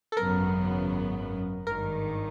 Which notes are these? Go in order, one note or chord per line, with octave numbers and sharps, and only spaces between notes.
A4
G#1 F#2 C#3 F#3 B3 A#4
G#1 G2 D#3 A#4